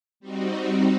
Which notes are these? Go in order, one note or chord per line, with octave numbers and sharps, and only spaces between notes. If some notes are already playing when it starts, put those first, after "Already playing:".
G3 C4 D#4 F#4